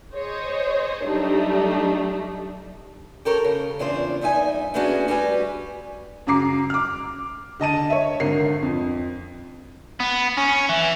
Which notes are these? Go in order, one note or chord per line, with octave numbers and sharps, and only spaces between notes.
G#4 C5 C#5 D#5
F#3 G3 A3 D4 D#4 G4
G4 A4 A#4 C#5
C#3
E2 C#3 D4 F4 C5
E2 G2 D#4 E5 G#5
A3 B3 C#4 D4 F#4 G#4
G3 F#4 B4 G#5
F#2 C#3 A#5 D6 C7
D6 F6
D3 D#5 A5 D#7
C#5 E5
G#1 D3 A#4 C7
F2
B3
C#4
E3